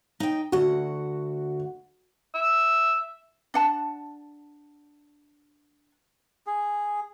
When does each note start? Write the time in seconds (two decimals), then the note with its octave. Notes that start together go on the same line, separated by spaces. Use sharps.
0.20 D#4 G5
0.52 D2 F#4 F#5
2.35 E5
3.54 D4 F#5 A5
6.47 G#4